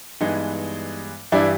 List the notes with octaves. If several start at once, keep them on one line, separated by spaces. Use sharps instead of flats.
G2 E3 G#3 B3 D#4
G2 E3 G3 D4 E4